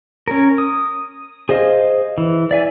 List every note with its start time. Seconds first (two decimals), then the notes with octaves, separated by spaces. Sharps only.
0.28 C#4 A#4
0.58 D#6
1.49 G#4 C5 D#5 F5
2.18 E3
2.51 D5 E5 G#5